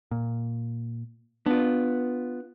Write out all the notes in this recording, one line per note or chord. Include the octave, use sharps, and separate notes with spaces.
A#2
B3 D4 F4